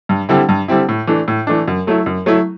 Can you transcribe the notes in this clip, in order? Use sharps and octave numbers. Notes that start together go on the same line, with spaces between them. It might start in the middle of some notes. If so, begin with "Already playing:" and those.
G2
D3 G3 C4 E4
G2
D3 G3 C4 E4
A2
E3 A3 D4
A2
E3 A3 D4
F#2
F#3 A3 E4
F#2
F#3 A3 E4